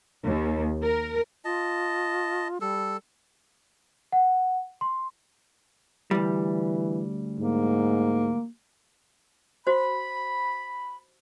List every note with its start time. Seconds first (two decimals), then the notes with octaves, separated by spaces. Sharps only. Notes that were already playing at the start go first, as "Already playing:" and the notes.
0.23 D#2
0.82 A#4
1.45 F4 D#5 A5
2.61 G3 A4
4.12 F#5
4.81 C6
6.11 D2 E3 G3
7.39 G#2 A#3
9.67 F#4 C5 B5